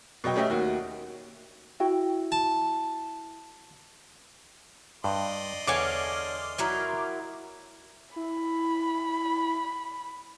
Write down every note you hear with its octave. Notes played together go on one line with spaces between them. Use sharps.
B2 F#3 D#5 G5
A3 C#4 G4 D#5 E5
D#2 F#4
E4 F#4 G5
A5
G2 D5 D#5 C6
E2 D3 A4 C#5 F5 G#5 D6 F6
F#3 E4 A#4
E4 B5